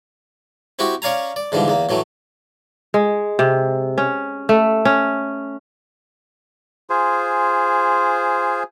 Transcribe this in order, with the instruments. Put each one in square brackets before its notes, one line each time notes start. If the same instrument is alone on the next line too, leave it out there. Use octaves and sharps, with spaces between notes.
[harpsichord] C4 E4 F#4 G4
C#4 C#5 D5 F5 G#5 A#5
D5
G#2 D3 E3 F3 G3
E2 A#3
A2 E3 F#3 A3
[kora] G#3
C3
C#4
A3
C#4
[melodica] F4 G#4 C5 G#5